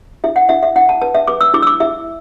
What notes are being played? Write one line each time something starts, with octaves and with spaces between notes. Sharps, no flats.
E4 E5
F#5
E4 E5
E5
E4 F#5
A5
B4 A5
E5
B4 D6
E6
E4 D6
E6
D6
E4 E5